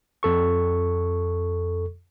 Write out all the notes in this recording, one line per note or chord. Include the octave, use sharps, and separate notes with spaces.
F2 A4 C#6